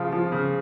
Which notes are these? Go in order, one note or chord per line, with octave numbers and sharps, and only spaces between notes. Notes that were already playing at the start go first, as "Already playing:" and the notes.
Already playing: C#3 F3 F4
F3
C#3